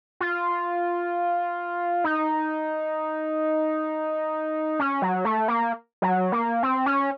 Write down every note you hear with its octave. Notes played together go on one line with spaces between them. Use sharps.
F4
D#4
C#4
F#3
A3
A#3
F#3
A#3
C4
C#4